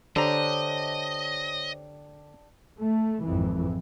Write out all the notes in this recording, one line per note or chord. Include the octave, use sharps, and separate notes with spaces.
D3 D4 G4 C5 C#5 D#5 A#5
A3
G#1 F2 E3